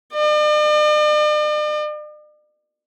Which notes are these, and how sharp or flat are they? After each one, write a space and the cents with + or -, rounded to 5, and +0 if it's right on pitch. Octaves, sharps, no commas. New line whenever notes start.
D5 +45